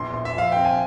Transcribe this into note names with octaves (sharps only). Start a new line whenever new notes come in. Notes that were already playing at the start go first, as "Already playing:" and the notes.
Already playing: A#1 E2 C6
A#1
E5
F3 F5
C4 G5
G#5